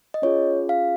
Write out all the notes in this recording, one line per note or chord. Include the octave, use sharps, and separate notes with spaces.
D#5
C#4 F4 G#4 C#5
F5